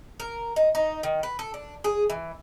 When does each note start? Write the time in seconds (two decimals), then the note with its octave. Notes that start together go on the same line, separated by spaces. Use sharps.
0.20 A#4
0.56 D#4
0.75 D#4
1.03 D#3
1.23 B4
1.39 A4
1.54 D4
1.84 G#4
2.10 E3